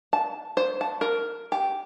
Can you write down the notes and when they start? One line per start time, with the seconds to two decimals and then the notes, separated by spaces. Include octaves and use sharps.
0.13 A5
0.57 C5
0.81 A5
1.01 A#4
1.52 G4